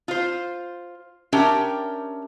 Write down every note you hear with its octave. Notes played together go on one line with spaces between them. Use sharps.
F4 C5
C#4 D4 G4 A#4 E5 G5